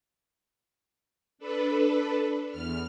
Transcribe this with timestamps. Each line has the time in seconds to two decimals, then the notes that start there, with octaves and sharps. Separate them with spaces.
1.38 D4 A4 B4
2.50 E2 F6